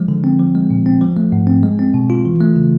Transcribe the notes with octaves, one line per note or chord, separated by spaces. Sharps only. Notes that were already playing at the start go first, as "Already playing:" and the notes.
Already playing: F3 G#3
D3
C4
F3
G#3
A#2
C4
F3
A3
G#2
C4
G#3
C4
B2
F4
E3
A3
C#3